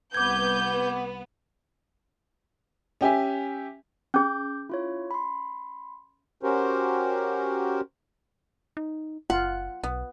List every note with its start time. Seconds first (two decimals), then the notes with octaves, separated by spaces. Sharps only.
0.14 C2 B3 D6 G6 G#6
3.01 C#4 G4 E5 G#5
4.14 C#4 G#4 D6 G6
4.69 E4 F4 C#5
5.11 B5 C6
6.43 C#4 F#4 G4 A#4 C5
8.77 D#4
9.30 F#1 F4 F#5
9.83 B1 B3